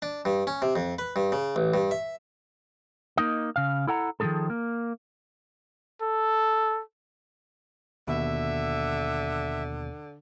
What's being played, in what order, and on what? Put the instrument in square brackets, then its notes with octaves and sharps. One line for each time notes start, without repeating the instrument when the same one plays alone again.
[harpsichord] D4
G2
C#4
C3
F2
B4
G2
C#3
A1
G2
E5
[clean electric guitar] A#3 D#4 D#5
C#3 F5
E4 A4 F#5 A#5
D#3 F3 F#3 C4 G#4 A4
A#3
[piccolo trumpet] A4
[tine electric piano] D#2 B2 [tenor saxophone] D3 [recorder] E5